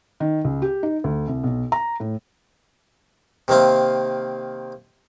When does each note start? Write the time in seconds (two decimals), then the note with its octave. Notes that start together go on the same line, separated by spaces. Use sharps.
0.20 D#3
0.45 C#2
0.62 G4
0.83 D#4
1.04 D2
1.28 C2
1.44 B1
1.72 A#5
2.00 A2
3.48 C3 D#3 A#3 C4